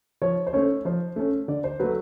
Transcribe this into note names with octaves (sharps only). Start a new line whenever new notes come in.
F3 C#5
C5
A3 C#4 C#5
F3 C5
A3 C#4
D3 D5
C5
F#3 A3 B4